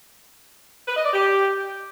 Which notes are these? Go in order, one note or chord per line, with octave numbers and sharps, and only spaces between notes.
B4
D#5
D5
G4